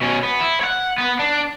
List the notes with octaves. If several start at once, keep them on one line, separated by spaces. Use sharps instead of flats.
B2 C#4
B3
E4
C#5 F#5
B3 B4
D4